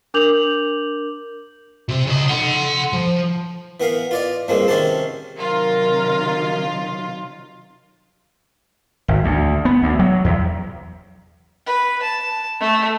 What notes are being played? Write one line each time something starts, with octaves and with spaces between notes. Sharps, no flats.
D4 A#4 D6 G6 F7 F#7
C3
C#3 D#5
F#5 C6
F3
E3 B3 A#4 F5
F4 D5 D#5
G2 F3 G#3 A#3 C4
C3 D#3 C#4 G4 C5 A5
C3 D#3 F#3 F4 A#4
G#1
D2
B3
D2
F#3
E2
B4
A5
A3